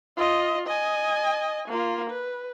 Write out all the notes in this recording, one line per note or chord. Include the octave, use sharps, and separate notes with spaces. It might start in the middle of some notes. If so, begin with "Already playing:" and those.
F4 D#5
D#5 G#5
A#3 F4
B4